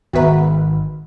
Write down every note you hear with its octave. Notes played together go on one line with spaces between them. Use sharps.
G#1 D#3 B3 F#4 B4 E5 A#5